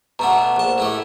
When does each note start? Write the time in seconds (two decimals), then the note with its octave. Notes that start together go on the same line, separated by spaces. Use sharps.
0.19 B2 A3 D4 F#5 A#5
0.56 A#1 A5
0.78 A2 A3 G4